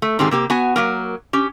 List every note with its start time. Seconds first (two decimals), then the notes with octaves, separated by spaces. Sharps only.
0.02 A3
0.19 G#2 D#3 C4 G4 G#4
0.31 C3 A#3 G4
0.50 B3 F#4 G#5
0.76 F#3 A#3 A#4
1.33 C#4 G4